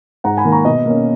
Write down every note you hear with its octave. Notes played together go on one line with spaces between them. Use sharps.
G#2 F#5 A#5
G#5 B5
D#3 A#3
A#5 C#6
B2 D#5
A#3 C#4